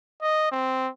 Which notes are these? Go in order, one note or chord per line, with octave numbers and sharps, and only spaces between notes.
D#5
C4